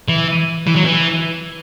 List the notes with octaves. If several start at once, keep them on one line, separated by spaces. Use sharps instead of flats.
E3
E3
F#3
E3